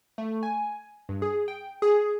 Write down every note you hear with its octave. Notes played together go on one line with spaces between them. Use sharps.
A3
G#5
G2
G#4
G5
G#4